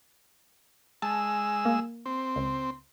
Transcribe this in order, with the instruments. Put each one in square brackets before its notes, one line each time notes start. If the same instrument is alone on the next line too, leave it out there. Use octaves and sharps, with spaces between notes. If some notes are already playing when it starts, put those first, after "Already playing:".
[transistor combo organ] G#3 E6 [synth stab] A5
[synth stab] A#3
[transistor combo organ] C4
[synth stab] C#2